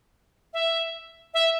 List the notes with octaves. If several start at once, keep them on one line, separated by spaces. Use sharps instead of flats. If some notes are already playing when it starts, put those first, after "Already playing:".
E5
E5